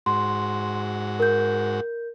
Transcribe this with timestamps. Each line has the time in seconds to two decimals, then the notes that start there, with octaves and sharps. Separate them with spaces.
0.06 G#2 F#4 C6
1.20 A#4 G6